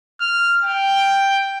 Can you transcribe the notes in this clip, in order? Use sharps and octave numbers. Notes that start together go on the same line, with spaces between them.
F6
G5